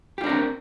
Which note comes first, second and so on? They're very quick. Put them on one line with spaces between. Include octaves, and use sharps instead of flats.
G4 F4 D4 A#4 C4